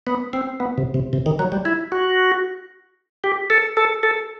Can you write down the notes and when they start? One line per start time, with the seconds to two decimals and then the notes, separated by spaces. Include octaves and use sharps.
0.07 B3
0.33 C4
0.60 B3
0.78 C3
0.94 C3
1.13 C3
1.26 D#3
1.39 F#3
1.52 G3
1.65 E4
1.92 F#4
3.24 G4
3.50 A4
3.77 A4
4.03 A4